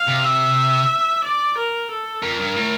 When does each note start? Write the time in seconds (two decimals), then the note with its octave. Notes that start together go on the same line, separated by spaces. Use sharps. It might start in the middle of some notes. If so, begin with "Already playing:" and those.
Already playing: F5
0.08 C3
0.24 E5
1.24 D5
1.58 A#4
1.90 A4
2.23 F2 A#4
2.40 G2
2.56 A2